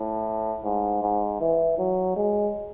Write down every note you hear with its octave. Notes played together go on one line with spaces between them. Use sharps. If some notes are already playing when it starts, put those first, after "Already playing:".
Already playing: A2
G#2
G#2
E3
F#3
G#3